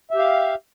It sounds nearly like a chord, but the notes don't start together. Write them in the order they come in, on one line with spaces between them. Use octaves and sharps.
E5 G4 F5